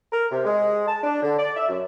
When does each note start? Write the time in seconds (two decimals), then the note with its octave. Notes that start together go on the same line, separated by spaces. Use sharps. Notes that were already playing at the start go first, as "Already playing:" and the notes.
0.11 A#4
0.31 C3
0.45 G#3
0.87 A5
1.03 D4
1.22 D3
1.39 D5
1.55 E5
1.68 F#2